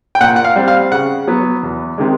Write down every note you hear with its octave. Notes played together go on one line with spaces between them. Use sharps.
G5
A#2 F#5
F#5
F5
G3 C4
F5
C#3 F#5
F#3 B3
E2
C3 D#3 G#3